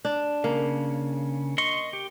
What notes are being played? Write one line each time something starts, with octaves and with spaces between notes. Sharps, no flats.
D4
C#3 A#3
D#5 C6 C#6
G4